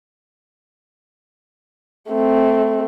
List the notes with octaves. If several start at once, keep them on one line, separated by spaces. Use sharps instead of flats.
A3 C4